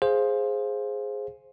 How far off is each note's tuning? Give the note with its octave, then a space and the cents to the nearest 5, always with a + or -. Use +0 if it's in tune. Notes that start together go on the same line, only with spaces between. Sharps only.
G#4 +0 C5 +10 F5 +0